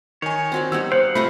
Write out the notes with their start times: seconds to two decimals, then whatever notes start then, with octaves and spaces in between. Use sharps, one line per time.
0.22 D#3 C#5 G#5
0.52 C4 F#4 D5
0.72 G3 B3 D#4 E6
0.92 C5 F5 F#5
1.15 C3 A3 F4 A#5 B5